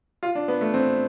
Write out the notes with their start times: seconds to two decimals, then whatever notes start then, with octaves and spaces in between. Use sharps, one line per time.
0.23 F4
0.35 D4
0.48 B3
0.61 A3
0.74 C4